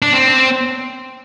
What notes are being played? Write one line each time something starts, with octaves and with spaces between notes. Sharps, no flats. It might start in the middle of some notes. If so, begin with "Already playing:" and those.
D4
C4